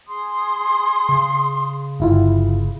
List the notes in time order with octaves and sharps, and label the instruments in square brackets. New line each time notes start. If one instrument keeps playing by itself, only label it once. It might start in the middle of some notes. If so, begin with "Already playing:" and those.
[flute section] G#4 C6 D#6
[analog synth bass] C#3
[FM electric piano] G1 E4 F4